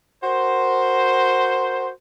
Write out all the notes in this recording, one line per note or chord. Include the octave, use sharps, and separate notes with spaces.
F#4 A#4 C5